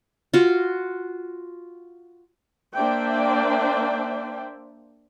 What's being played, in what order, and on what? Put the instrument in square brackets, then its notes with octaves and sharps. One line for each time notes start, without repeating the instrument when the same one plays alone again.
[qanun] F4 F#4
[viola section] A#3 D4 C5 D5 E5 G5